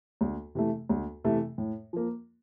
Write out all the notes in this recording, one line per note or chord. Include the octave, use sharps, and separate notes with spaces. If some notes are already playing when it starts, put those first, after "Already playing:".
D2
C3 E3 A3
D2
C3 E3 A3
A2
F3 A#3